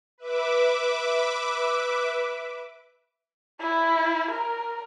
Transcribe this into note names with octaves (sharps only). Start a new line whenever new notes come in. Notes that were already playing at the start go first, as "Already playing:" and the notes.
B4 E5 D6
E4
A#4